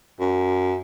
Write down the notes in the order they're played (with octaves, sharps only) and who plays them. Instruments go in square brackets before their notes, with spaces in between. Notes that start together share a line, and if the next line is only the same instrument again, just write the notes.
[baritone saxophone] F#2